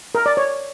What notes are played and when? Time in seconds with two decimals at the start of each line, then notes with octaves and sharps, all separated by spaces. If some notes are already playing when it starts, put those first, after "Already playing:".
0.15 A#4
0.26 D5
0.37 C#5